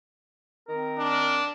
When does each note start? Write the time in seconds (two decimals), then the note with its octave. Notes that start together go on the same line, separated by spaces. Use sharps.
0.68 D#3 C4 A#4
0.98 D4